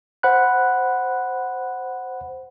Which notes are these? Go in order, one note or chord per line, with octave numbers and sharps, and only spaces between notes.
C5 F#5 B5 F#6